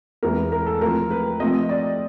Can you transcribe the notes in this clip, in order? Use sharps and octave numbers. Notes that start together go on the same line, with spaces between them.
E2 C3 E3 G#3 B3 A#4
A#4
A4
C3 F3 A3 A#4
B4
C3 F3 A3 D#5
D5